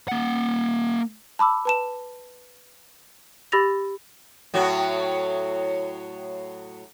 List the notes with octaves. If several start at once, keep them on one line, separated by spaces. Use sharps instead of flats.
A#3 F#5
A5 B5 D6 E6
B4 A5 E7
G4 B5 E6 A6 A#6 F7
A2 F#3 F#4